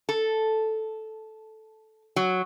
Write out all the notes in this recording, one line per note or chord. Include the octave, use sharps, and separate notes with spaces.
A4
F#3